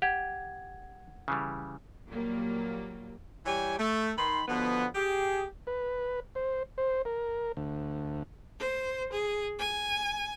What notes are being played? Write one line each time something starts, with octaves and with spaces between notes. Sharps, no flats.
G4 F#5 G#6
C#3 E3 G3
A#2 F#3 G3 A#3
E3 G3 G4 C#5 G5 G#5
A3
D#3 B5 C6
B2 D3 F3 B3
G4 G#4
B4
C5
C5
A#4
D2
C5
G#4
G#5